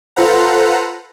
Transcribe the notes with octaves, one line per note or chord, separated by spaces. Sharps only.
F4 A4 B4 C5 F#5 A#5